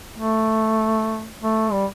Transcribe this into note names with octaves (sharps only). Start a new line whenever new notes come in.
A3
A3
G3